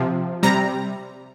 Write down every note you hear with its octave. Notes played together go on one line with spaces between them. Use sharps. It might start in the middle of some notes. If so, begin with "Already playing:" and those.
Already playing: C3 F3
C3 G3 A#5